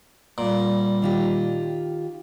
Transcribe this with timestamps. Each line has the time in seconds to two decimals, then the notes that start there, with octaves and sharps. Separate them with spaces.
0.38 A#2 G3
1.02 D#3 F4 G4